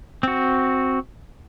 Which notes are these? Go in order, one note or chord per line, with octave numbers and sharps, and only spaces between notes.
C4 F#4